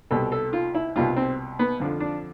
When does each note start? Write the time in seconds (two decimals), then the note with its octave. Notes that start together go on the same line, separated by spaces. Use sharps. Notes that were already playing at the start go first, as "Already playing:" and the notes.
0.11 C2 B2 G3 A4
0.32 A4
0.53 F4
0.75 E4
0.95 C2 B2 G3 F4
1.16 C4
1.59 B3
1.80 F2 D3 F3
2.00 D4